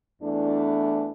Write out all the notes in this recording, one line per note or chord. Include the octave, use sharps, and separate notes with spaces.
E2 E3 A3 D4